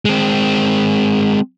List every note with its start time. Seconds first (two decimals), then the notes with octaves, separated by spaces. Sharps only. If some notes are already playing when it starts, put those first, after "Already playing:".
0.05 G#3 C4